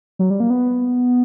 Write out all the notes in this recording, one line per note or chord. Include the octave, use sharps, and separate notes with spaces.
F#3
G3
A#3
B3